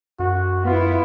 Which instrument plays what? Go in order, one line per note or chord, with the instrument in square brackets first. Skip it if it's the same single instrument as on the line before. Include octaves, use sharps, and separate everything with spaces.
[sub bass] F#2 [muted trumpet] F#4
[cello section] B3 E4 [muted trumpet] F4